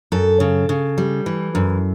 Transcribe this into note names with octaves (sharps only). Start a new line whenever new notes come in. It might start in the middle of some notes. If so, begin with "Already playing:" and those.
F#2 A4
C#3
C#3
G3
E3
F#2